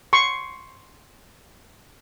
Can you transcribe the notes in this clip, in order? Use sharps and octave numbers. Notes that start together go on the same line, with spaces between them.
C6 C#6